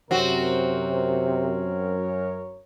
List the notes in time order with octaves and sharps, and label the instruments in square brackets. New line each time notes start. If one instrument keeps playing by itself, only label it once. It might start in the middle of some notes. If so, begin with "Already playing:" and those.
[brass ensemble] F#2 A#4 C#5 [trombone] C3 [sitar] C4 F#4